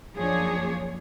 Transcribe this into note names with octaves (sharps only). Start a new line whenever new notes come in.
F#2 F3 A#3 D4 G#4 C#5